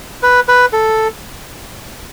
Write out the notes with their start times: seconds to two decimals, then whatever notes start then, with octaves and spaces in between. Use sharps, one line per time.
0.23 B4
0.48 B4
0.73 A4